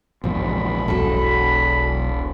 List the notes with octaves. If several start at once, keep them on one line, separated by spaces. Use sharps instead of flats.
A#1 E2 G#2 B5
E1 B1 F#3 A4